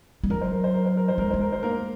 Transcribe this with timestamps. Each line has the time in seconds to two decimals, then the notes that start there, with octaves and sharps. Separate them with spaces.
0.23 G#3
0.30 F#3 A#4
0.41 C5
0.52 A#4
0.64 C5
0.74 A#4
0.86 C5
0.97 A#4
1.08 C5
1.18 G#3 A#4
1.30 G#3 C5
1.41 A#4
1.52 C5
1.63 A#3 A#4